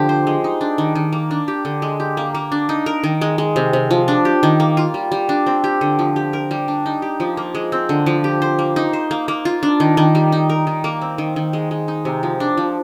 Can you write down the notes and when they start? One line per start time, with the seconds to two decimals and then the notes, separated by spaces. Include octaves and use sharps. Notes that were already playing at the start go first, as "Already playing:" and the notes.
Already playing: D3 F3 G4
0.09 C5
0.27 G#3
0.44 D#4
0.61 D4
0.78 D#3
0.95 D#3
1.13 A#3
1.31 D4
1.48 G4
1.65 D3
1.82 G#3
2.00 G4
2.17 A#3
2.35 A#3
2.52 D4
2.69 D#4
2.86 A#4
3.03 D#3
3.21 G#3
3.38 G#3
3.56 C3
3.73 C3
3.91 F3
4.08 D4
4.25 G4
4.43 D#3
4.60 A#3
4.77 F4
4.94 G3
5.12 G3
5.29 D4
5.46 C4
5.64 G4
5.81 D3
5.99 F3
6.16 G4
6.33 A#4
6.51 G3
6.68 D4
6.86 D#4
7.02 G4
7.20 F3
7.37 A#3
7.55 G#3
7.72 C4
7.89 D3
8.06 F3
8.24 G4
8.42 C5
8.59 A#3
8.76 D#4
8.93 C5
9.11 A#3
9.28 A#3
9.45 F4
9.63 D4
9.80 D#3
9.97 D#3
10.15 G3
10.32 D#4
10.50 A#4
10.67 D#3
10.84 A#3
11.01 C4
11.18 D#3
11.36 D#3
11.53 G#3
11.71 G#3
11.88 D#4
12.05 C3
12.23 F3
12.40 D4
12.57 F3